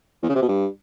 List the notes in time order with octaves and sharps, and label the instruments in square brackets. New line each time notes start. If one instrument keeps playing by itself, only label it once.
[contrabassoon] E2
C#3
C3
B2
G2